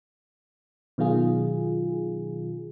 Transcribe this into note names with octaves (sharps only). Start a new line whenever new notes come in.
B2 D#3 F#3 F4 G#4